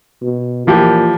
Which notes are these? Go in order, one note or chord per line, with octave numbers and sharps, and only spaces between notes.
B2
A#2 E3 F3 G4